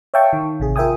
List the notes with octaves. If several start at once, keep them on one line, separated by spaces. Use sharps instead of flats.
C#5 E5 F5 G5 A5 C#6
D#3
A1 C3 G#4
F4 A#4 E5 G5 G#5 D#6